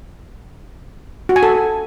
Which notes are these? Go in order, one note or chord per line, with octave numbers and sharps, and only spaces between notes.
F#4
G#5
A4